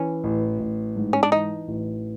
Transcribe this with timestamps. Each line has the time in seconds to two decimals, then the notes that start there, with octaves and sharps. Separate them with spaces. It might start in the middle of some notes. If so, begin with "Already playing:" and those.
Already playing: E3 C#4
0.24 A1
0.60 A1
0.96 G#2
1.13 C#4
1.23 D4
1.32 E3 D#4
1.68 A1